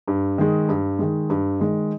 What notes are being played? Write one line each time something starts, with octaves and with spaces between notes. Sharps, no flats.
G2
D#3 G#3
G2
D#3 G#3
G2
D#3 G#3